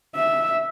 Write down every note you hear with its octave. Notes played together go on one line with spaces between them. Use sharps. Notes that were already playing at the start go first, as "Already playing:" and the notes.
E5